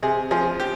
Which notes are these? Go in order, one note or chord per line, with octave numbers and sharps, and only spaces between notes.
C3 G#4
F3 G#4
G4